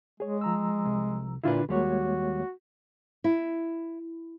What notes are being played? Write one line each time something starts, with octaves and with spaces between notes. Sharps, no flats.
G#3 G#4 C#5
F3 A#5 E6
C2
A#2 D3 D4 E4 F4 B4
D#2 G3 G#3 A#3 F#4 C#5
E4